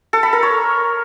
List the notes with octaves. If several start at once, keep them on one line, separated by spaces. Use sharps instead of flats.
A4
B5
A#4
C#5